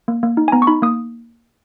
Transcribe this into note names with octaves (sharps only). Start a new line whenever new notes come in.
A#3
A#3
D#4
G#5
B3 A#5
C#6
D#4 B5
A#3 D#6